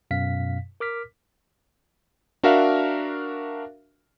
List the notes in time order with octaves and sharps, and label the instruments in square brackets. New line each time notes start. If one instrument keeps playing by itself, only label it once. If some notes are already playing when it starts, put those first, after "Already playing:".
[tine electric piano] F#2 B2 F5 B6
A#4 D6 F6 B6
[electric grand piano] D4 F#4 A#4 E5 F5